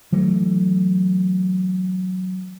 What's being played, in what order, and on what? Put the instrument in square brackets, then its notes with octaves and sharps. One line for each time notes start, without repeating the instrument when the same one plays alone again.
[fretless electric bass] E3 F#3 A3